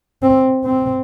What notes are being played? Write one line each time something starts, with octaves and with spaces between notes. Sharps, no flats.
C4
C4